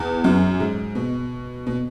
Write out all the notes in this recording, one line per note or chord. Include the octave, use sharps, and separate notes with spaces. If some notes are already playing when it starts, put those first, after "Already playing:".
Already playing: E2
F#2
G#2
B2
B2